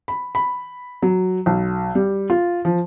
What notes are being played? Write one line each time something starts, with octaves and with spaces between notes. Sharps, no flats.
B5
B5
F#3
B1
G3
F4
F3